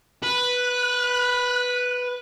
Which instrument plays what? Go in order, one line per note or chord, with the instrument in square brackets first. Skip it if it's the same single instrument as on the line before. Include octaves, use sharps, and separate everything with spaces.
[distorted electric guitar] B4 [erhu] F#6